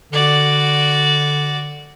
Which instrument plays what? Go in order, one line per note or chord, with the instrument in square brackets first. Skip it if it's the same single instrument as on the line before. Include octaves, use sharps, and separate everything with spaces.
[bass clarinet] D3 [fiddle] F#4 D5